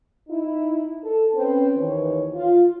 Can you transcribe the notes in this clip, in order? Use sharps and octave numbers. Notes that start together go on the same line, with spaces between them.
D#4 E4
A4
C4 C#4 B4 C5
D#2 D#3 E3 C#5
F4